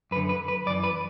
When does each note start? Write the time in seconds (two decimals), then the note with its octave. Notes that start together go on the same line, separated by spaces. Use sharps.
0.11 F#2 B4
0.15 D3
0.29 B4
0.48 B4
0.66 F#2 D5
0.70 E3
0.84 B4